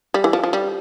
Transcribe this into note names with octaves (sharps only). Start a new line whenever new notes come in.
G3
E3
F3
F3
G3